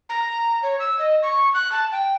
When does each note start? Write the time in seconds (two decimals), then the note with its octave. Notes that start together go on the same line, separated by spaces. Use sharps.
0.09 A#5
0.63 C#5
0.80 E6
0.99 D#5
1.23 C#6
1.54 F#6
1.72 A5
1.92 G5